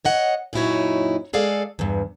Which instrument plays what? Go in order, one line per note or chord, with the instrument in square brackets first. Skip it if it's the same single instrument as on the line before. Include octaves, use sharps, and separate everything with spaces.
[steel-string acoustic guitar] C#5 D#5 F#5
F#2 A#2 D#4 E4 F#4 C#5
G#3 G#4 A4 D5 F5
E2 G2